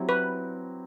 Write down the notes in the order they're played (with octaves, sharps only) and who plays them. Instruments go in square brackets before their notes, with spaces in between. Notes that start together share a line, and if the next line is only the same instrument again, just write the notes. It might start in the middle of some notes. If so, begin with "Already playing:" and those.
Already playing: [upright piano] F#3 C4 E4 G4
[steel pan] B4